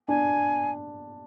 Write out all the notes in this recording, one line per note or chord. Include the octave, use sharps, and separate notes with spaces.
D4 G#5